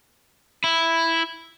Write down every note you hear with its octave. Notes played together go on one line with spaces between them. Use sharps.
E4